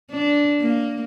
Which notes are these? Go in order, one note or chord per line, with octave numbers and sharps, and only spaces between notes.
D4
A#3